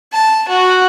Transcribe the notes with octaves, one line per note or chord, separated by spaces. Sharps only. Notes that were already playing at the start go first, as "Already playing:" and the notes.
A5
F#4